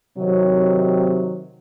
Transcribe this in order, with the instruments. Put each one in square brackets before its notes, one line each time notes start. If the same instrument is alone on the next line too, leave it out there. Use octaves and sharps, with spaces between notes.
[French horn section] C3 D#3 F#3